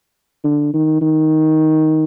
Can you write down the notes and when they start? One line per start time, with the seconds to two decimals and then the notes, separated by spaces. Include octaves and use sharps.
0.44 D3
0.74 D#3
1.01 D#3